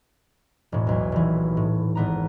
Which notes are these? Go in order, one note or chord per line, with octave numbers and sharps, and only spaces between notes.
E1 A2
B1 E2
D#1 E3
A2
G#1 B3 A#5